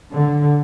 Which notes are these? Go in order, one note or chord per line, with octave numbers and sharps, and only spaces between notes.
D3